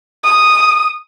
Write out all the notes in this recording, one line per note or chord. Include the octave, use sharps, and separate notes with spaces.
D#6